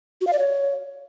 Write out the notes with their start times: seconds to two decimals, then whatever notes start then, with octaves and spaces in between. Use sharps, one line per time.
0.21 F#4
0.27 F5
0.33 D5
0.39 C#5